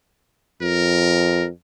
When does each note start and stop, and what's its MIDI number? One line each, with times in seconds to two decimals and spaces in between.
0.62 1.49 41
0.62 1.45 70